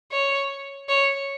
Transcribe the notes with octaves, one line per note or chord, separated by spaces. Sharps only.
C#5
C#5